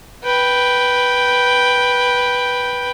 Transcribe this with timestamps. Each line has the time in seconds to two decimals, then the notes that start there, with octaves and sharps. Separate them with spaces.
0.24 B4 G5